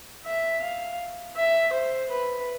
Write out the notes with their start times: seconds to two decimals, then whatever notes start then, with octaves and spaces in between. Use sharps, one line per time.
0.26 E5
0.62 F5
1.36 E5
1.73 C5
2.09 B4